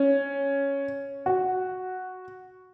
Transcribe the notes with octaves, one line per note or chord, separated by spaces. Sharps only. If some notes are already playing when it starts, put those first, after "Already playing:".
Already playing: C#4
F#4